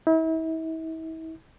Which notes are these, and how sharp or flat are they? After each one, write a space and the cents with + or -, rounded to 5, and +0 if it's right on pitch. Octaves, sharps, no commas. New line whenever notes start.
E4 -40